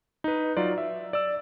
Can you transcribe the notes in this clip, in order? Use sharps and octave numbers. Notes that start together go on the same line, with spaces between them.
D#4 B4
F#3 D#4 F4 D5
E5
D5 E6